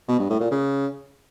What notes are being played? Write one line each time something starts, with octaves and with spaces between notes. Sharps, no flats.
B2
G2
A2
A#2
C#3